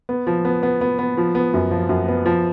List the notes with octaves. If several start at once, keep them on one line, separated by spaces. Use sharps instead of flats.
B3
F3
B3
B3
B3
B3
F3
B3
F#2
F3
F#2
B3
F3